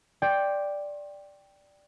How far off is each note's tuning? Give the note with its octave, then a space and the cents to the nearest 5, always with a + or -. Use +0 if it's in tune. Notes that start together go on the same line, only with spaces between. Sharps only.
D5 +0 G5 +5 C6 +45